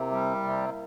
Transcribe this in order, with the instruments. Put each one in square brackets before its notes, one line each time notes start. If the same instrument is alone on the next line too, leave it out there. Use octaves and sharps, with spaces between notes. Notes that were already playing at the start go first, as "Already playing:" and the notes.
Already playing: [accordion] C3 [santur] A#3 E4
[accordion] G3
C3